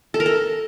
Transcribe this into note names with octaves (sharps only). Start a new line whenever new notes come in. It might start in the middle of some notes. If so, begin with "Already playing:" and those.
A4
A#4
A4